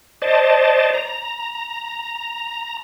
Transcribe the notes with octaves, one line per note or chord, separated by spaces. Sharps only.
C5 D5 D#5 A5
A#5